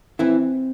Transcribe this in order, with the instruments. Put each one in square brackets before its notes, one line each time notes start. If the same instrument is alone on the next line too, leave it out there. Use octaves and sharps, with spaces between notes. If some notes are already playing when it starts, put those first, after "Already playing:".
[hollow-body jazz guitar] E3 E4 [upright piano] C4